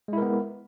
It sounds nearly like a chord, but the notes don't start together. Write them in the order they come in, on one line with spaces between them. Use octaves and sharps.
G#3 E4 A#4 B3